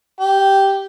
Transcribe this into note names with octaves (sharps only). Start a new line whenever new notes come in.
G4